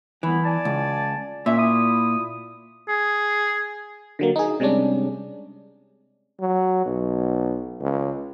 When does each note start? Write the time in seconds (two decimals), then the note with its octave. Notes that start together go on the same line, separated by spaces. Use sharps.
0.23 C2 E3 B3 E4
0.44 D5 G#5 A5
0.65 C#2
1.46 A#2 C#4 E5
1.58 E4 B5 D#6
2.89 G#4
4.19 D3 F#3 A#3
4.36 D#4 G#4
4.60 C3 G3 G#3 C#4 D4
6.40 F#3
6.86 B1
7.80 C#2